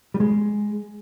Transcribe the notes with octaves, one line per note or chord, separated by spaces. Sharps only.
G3
G#3